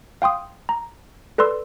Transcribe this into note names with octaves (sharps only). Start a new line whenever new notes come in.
F5 G5 C6 D#6
A#5
A4 B4 D5 C6 E6